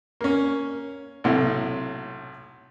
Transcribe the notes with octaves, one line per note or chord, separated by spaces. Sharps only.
A#3 C#4
B1 A2 C3